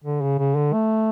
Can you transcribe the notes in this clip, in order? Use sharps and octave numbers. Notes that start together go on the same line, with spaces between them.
D3
C#3
C#3
D3
A3